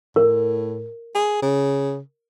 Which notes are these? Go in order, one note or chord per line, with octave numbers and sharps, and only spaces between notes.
A2 A#4
G#4
C#3